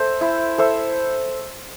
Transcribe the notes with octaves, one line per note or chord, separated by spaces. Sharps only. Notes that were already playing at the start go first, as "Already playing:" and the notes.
Already playing: A4 C5 E5
E4
A4 C5 E5